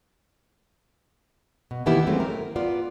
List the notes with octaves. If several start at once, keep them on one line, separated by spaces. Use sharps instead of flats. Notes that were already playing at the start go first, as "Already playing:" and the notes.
B2
D#3 E3 A#3 B3 E4 G4
F#3 G#3 A3 C4 C#4
A#4
B3 F4 D5